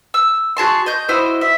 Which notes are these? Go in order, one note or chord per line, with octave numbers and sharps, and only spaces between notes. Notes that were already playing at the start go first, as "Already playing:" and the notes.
E6
F#4 G#4 A5 C6
D#5 G6
E4 F#4 C5 D#5
E5